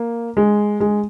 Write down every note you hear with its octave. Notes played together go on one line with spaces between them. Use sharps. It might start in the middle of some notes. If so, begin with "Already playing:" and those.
Already playing: A#3
G#3
G#3